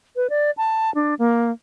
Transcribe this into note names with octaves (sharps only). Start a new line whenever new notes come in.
B4
D5
A5
D4
A#3